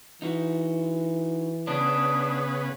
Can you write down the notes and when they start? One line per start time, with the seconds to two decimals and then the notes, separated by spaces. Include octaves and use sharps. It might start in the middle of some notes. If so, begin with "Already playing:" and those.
0.22 E3 D#4 F#4
1.67 C#3 B3 D4 D#6